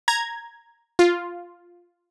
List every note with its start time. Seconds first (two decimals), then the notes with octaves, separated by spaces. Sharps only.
0.08 A#5 G#6
0.99 F4